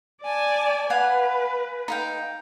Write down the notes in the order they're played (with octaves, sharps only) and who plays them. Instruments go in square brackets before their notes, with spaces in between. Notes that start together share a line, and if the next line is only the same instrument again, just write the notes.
[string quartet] D5 G#5 A5
[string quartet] B4 [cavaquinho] F5 F#5 G#5
[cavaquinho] D#4 F5 G5